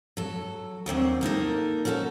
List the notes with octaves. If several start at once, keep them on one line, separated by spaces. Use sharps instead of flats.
F#3 A4
D#2 F#3 C4 D4
A#3 D#4 A4 A#4
C#4 D#4 F#4 G#4 A4